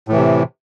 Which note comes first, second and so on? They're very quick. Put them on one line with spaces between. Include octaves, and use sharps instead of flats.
A2 E3 C3